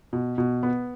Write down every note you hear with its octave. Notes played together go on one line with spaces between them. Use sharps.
B2
B2
B3